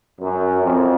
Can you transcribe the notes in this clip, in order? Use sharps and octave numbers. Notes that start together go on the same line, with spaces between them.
F#2
F2